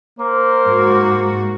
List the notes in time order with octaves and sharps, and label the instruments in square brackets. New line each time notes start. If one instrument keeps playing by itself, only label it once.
[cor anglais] A#3 [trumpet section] A#4 C5
[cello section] G#2 F#4